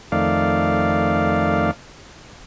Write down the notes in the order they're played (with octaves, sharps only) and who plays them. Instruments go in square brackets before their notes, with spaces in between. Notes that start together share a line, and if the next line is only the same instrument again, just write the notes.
[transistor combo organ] F2 D#3 A3 D5 F5